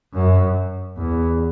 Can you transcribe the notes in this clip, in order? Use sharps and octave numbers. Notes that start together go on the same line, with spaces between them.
F#2
E2